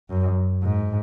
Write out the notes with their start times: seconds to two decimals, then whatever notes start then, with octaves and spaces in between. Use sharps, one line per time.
0.10 F#2
0.63 G#2